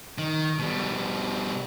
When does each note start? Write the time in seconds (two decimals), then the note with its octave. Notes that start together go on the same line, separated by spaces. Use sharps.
0.18 D#3
0.59 B2 G3